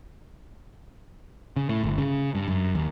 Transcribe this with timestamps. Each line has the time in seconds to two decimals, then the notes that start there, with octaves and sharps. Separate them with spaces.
1.56 C#3
1.69 A2
1.83 G1
1.98 C#3
2.35 G2
2.48 F#2
2.75 D#2